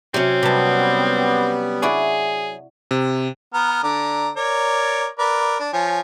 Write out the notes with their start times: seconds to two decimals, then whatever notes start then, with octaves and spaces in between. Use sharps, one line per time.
0.14 C3 F#3 C4 C#4
0.43 C3 G3 B3 A5
1.82 E4 F#4 G#4 D5
2.91 C3
3.54 B3 A#5 F6
3.83 D3 D5 A#5
4.37 A#4 C#5 D5
5.19 A#4 B4 D5
5.60 D4
5.73 F3 C#5 G#5